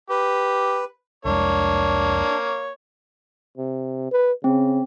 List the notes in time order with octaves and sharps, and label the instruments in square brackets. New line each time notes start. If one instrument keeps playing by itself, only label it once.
[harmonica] G4 [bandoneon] B4
[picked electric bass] C2 F2 G#3 [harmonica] A#3 C#5 [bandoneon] D4
[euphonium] C3
B4
[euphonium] C#3 [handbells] C4